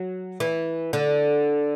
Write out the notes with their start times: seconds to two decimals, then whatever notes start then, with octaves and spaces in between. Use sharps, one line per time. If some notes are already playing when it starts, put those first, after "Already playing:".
Already playing: F#3
0.40 E3
0.93 D3